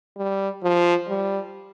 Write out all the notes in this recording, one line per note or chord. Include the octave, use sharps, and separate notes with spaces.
G3
F3
G3